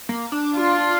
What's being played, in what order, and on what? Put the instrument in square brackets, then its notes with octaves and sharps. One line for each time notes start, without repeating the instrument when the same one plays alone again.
[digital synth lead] A#3
D4
[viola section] F4